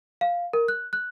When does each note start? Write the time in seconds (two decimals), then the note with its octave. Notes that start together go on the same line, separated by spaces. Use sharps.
0.21 F5
0.53 A#4
0.68 F#6
0.93 F#6